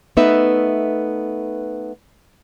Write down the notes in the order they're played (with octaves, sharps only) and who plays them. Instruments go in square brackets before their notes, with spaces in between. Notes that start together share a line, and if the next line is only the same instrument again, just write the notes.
[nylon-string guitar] A3 B3 D#4 B4 E5